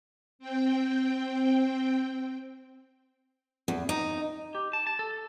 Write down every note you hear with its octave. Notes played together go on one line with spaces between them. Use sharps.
C4 G5
E2
D#4
G4
A5
A5
A4